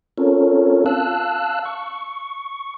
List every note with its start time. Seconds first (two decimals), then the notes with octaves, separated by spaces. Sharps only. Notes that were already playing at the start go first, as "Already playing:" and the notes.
0.18 C4 C#4 F4 A4 A#4 C#5
0.86 F5 A5 E6 F#6
1.65 C#6